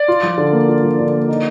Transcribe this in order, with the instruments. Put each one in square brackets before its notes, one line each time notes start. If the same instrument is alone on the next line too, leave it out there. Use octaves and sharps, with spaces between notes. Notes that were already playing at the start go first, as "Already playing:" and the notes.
Already playing: [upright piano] D5
[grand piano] F4
F3
D3
A#3
F4
F3
D3
A#3
D#4